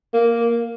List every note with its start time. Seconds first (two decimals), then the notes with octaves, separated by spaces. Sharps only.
0.14 A#3